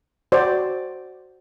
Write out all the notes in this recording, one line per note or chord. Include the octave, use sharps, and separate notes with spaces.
F#4 C5 D5